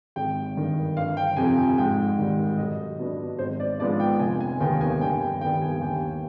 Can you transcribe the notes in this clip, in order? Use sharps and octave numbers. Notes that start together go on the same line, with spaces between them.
G#1 G5
G2 D#3
G1 F5
G5
F2 C3 G#5
G5
G#2 G5
D#3 G3
B1 D#5
B2 B3 D4
G#1 C5
D5
G#2 F3 B3 D4 D5
G5
F1 G#5
G#5
D#2 D#3 B3 G5
G#5
G2 G5
G5
D#3 G3 B3 G5
G#5
D#2 G5